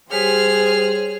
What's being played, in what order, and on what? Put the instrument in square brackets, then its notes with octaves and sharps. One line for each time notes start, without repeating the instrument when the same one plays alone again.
[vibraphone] G3 G4 C#5 [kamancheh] G#4 [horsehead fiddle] C5 [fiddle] F6